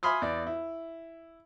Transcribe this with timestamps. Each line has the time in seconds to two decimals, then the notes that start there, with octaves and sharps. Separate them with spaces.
0.03 E5 G#5 B5 C6 D#6 F6
0.22 E2 D5
0.47 E4